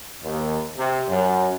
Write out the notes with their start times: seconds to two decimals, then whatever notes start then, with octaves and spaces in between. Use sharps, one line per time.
0.23 D#2
0.77 C3
1.08 F#2